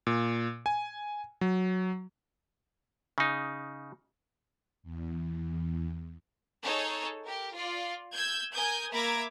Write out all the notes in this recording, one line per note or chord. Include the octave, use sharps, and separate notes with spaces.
A#2
G#5
F#3
C#3 D#4
E2
D#4 G#4 A4 C#5
G4 A#4
F4 D5
E6 G6 G#6
A#4 G#5 D#6 G6 G#6
A#3 E5 A#5 B5 D6 G#6